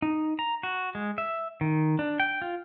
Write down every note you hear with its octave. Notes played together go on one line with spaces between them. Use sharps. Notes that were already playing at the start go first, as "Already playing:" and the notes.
D#4
A#5
F#4
G#3
E5
D#3
D4
G5
F4